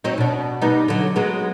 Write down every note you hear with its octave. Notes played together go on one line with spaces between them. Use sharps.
F#3 C4 D#4
B2 D4
G3 B3 D#4
D3 F#3
F#3 G#3 B3